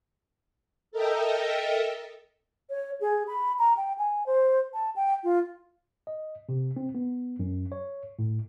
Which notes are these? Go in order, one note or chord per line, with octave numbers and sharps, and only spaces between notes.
A4 A#4 D#5 E5 G5
C#5
G#4
B5
A#5
G5
G#5
C5
A5
G5
F4
D#5
C3
C4
B3
F#2
C#5
A2